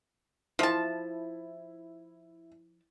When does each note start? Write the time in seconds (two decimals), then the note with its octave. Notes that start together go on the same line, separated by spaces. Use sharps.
0.59 F3 E4 A5